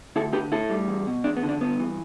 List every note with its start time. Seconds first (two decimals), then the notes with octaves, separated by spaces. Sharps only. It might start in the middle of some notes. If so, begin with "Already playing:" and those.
0.16 D2 E4 A4
0.33 D3 G4 B4
0.52 A2 E4 A4
0.70 G3
0.88 E2
1.07 B2
1.24 E2 D4
1.37 B3
1.43 D3
1.49 D4
1.61 G2 B3
1.80 E3